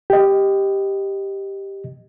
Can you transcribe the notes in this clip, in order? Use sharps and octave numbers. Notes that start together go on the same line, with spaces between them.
G4 D#5